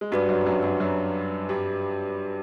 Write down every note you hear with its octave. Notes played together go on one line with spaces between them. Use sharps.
G#3
G2 G3 D4 F#4 B4 D5
F#2 F#3
F#2 F#3
F#2 F#3
F#2 F#3
G2 G3